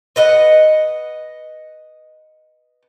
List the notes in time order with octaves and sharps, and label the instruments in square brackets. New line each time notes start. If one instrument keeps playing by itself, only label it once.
[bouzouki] B4 D#5 F#5